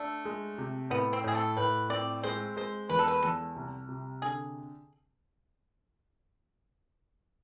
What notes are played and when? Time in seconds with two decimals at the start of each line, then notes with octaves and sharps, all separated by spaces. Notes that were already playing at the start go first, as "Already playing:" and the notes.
Already playing: A3 D4
0.25 G#3
0.58 C3
0.90 A2 B3
1.13 C4
1.24 A2 G#4
1.35 A4
1.57 A2 B4
1.90 C4 D5
2.23 G#3 C5
2.56 G#3 C5
2.89 E2 B4
2.99 A4
3.08 B4
3.22 E2 A4
3.56 C2
3.89 C3
4.22 D3 G#4